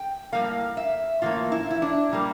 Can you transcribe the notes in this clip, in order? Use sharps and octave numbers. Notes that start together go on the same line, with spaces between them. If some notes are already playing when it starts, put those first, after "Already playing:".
Already playing: G5
A2 G3 A#3 F5
E5
A2 E3 A#3 F4
E4
E4
D4
A#2 G3 A#3